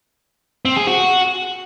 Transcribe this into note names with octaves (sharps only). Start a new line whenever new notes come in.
C4
G#4
F#4